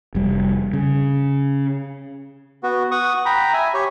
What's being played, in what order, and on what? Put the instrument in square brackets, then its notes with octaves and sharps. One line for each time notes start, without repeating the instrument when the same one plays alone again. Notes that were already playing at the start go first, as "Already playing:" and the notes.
[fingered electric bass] F1 G3
C#3
[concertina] B3 F#4
F#5 C#6 D#6
G5 A#5 B5
E5 G#5
G4 C#5